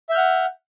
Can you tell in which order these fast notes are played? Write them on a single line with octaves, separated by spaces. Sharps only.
E5 G6 F6 F#5